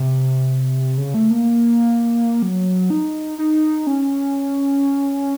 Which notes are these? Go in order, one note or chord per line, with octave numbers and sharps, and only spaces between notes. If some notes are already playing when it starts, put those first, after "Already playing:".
Already playing: C3
C#3
A3
A#3
F#3
D#4
D#4
C#4